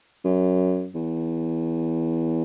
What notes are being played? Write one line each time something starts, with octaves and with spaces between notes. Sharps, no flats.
F#2
E2